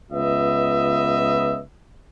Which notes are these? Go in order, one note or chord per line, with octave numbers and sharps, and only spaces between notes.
C#2 B3 F4 B4 D#5 E5